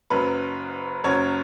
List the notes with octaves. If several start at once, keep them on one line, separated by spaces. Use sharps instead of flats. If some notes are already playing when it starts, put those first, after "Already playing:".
F#1 F#2 F#3 B4
F#1 F#2 F#3 C#5